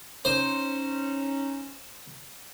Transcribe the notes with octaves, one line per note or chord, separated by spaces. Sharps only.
C#4 D#4 C5